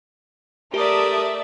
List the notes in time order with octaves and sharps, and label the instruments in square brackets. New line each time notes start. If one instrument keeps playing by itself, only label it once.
[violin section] A3 D5 E5 [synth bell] G4 [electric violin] A#4 D#6